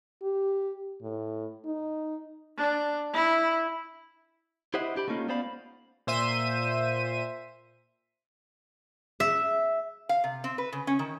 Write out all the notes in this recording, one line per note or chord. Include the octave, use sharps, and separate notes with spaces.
G4
A2
D#4
D4
E4
E4 G4 C5 D#5 E5 F#5
D4 G4 B5
A3 A#3 C#4 D#4 F4
B3 C#4 C5 D5 F5 B5
A#2 C5 E5 D#7
E5
F5
C3
C4
B4
C#3
C#4
D#3